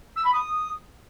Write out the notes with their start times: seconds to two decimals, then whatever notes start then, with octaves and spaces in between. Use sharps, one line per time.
0.16 E6
0.24 B5
0.32 D#6